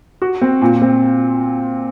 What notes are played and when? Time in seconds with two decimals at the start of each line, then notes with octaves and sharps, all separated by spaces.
0.22 F#4
0.42 C4
0.61 A#2
0.82 C4